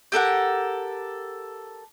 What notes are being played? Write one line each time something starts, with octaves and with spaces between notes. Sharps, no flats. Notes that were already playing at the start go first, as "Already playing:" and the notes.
G4 A4 A#4 F#5